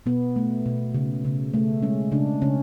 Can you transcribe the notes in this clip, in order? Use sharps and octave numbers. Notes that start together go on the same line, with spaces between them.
B2 B3
A3
B2
C#3
C#3
A3
G#3 C#4
C#3 D4
C#3 C#4